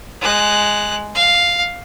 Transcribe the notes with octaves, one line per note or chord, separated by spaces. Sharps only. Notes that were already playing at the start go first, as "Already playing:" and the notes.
G#3 F#6
F5